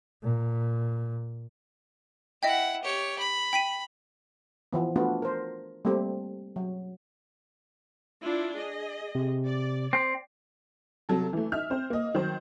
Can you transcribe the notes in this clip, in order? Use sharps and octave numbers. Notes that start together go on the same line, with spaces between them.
A#2
E4 D#5 E5 F#5 G5
G4 C#5
B5
G5 B6 D#7
E3 F3 B3
A3 B3 D4 F4 F#4
A#4 C5
G3 A3 A#3 C4 G4 A4
F#3
D4 E4 F4
G#4 D#5
C3
D5
C4
C3 F#3 A4
E3 A3
D#4 E5 F6
C4 C5
A#3 D#5
D#3 F#3 C5